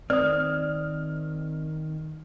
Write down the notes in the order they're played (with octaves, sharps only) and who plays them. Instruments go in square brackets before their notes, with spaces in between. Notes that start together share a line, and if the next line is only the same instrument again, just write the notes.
[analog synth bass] D#3 [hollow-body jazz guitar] C4 [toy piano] D5 D#6 [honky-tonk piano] F6